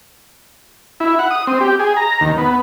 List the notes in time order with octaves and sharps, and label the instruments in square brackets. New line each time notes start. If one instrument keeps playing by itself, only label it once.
[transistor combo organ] E4
F#5
D#6
C4
G4
G#4
A#5
D#2
B3